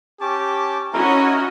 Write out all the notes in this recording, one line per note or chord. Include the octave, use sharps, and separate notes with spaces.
C#4 G4 A5 D6
C#4 D#4 E4 F#4 A#4 D#5